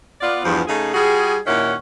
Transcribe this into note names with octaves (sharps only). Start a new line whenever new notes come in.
B3 F4 D5
E2 G2 F3
C#3 A3 D#4 G#4
G3 F4 F#4 G#4
D#2 A#2 D#3 C#4 E4 F#5